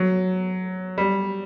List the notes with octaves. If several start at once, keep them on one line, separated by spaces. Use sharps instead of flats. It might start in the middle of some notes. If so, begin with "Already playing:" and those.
Already playing: F#3
G3